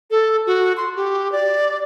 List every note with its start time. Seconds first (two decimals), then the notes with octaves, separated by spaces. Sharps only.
0.11 A4
0.47 F#4
0.77 C6
0.96 G4
1.32 D5